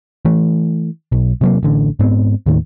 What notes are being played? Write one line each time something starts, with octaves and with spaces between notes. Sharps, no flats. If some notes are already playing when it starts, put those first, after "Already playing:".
E3 A3
B1
C3 F#3 A#3
A1 D3
G#2 B3 C4
D#2 A2 D#3